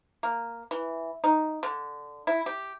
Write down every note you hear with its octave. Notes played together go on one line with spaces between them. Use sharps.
A#3
E3
D#4
D3
E4
G4